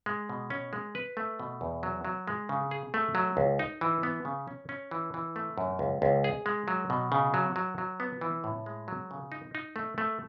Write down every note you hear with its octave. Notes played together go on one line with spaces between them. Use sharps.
G#3
B2
C#4
G#3
B4
A3
B2
E2
F#3
F#3
G#3
C#3
G#4
A3
F#3
C#2
D#4
E3
B3
C#3
C#4
C#4
E3
E3
A3
F#2
C#2
C#2
G#4
G#3
F#3
B2
C#3
F#3
F#3
F#3
B3
E3
A2
G#3
F#3
C#3
D#4
D#4
A3
A3